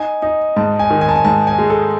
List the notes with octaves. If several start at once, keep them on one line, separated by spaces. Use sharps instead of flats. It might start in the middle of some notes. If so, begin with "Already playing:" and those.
Already playing: D#4 G#5
D#4
G#2 A5
G#5
D#3
G#5
A5
G#5
G#2 A5
G#5
G#3
A4